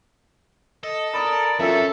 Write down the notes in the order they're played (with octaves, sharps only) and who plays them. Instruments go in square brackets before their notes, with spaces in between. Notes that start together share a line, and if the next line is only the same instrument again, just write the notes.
[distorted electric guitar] A4 [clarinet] D#5
[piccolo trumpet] A#4 [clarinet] D5 [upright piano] B5 D#6
[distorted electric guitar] F#2 [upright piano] C#4 F4 A#4 [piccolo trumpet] A4 [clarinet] E5